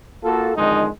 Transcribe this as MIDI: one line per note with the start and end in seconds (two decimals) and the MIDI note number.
0.24 0.53 58
0.24 0.53 65
0.24 0.53 66
0.24 0.53 69
0.56 0.87 41
0.56 0.87 44
0.56 0.87 50
0.56 0.87 51
0.56 0.87 56
0.56 0.87 63